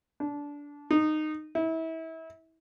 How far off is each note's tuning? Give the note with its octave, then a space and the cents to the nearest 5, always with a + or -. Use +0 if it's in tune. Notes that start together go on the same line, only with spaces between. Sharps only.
D4 -20
D#4 -15
E4 -25